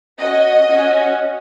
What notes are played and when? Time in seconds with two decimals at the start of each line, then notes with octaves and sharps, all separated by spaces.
0.19 C#4 F#4 D#5
0.68 C#4 F#4